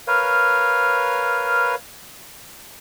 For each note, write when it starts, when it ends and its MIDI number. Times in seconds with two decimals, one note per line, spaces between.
0.07 1.75 70
0.07 1.75 71
0.07 1.75 73
0.07 1.75 77